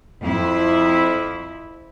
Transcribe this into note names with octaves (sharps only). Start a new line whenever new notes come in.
F2 E4